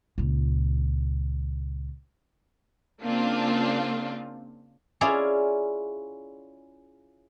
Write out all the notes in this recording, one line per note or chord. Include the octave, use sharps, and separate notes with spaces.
C#2 A#2
C#3 A#3 C4 D4 F4
C#4 E4 F4 G#4 D5